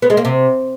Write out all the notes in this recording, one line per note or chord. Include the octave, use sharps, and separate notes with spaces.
B3
G#3
A#3
C3